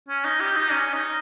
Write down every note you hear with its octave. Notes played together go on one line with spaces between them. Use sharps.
C#4
D#4
G4
D#4
C#4
D#4